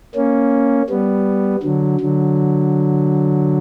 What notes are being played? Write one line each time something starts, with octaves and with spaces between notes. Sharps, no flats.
A#3 C#4
G3 B3
D3 F#3
D3 F#3